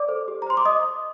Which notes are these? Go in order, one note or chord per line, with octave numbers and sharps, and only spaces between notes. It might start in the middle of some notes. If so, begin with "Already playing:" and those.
Already playing: D5 D6
A4 C5
G4
A#5
C5 C6
D6
D#5 D#6